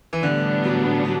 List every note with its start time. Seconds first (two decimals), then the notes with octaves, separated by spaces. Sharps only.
0.13 E3
0.23 A2 D3 G3 B3 D4
0.64 F#3
1.05 F#3